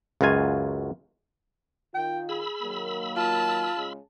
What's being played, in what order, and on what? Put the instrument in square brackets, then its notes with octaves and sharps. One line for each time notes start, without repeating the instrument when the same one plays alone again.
[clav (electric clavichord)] C#2 F#2 F#3 F4 G#5
[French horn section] D#3 F4 [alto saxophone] G5
[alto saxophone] G#4 [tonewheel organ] B5 E6
[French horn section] D#3 F#3 A#3
[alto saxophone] F4 [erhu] A5
[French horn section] C#3 G#3